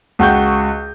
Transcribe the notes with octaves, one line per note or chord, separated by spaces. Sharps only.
C#2 F#4 G5 C#6 G6